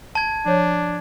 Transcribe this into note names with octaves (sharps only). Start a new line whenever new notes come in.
A5 G#6
F3 D4 C#5 G6